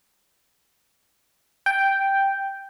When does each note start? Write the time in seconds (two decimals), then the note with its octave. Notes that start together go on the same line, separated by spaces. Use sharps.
1.66 G5